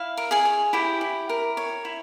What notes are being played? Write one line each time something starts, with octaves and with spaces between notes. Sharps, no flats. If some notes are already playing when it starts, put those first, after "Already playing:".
Already playing: E4 F5
A#4
G#4 G#5
C#5
E4 G4 G5
E4
A#4
C#5
E4